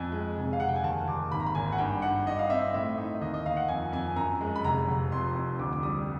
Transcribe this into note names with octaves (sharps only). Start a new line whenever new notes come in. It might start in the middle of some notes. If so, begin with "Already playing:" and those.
Already playing: F2 G#5
G#3
F1
F5
F1 F#5
G5
G#5
D#2 A5
D#2 D6
G#1 B5
A#5
B5
G#1 G#5
F#5
G2 G5
G2 F#5
G2 D#5
F5
C4 E5
A2 E5
D#4
D#2 D#5
D#5
D#2 F5
F#5
F2 G#5
F2 G#5
F#2 A#5
G#3
B5
F1 A#5
F1
F2 C6
F2
D2 D6
D6
G3 D#6